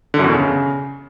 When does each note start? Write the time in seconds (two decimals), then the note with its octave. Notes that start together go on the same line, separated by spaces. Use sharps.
0.14 D3
0.19 F#2
0.24 E2
0.29 B2
0.34 C#3